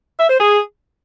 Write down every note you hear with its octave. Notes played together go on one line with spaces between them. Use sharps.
E5
C5
G#4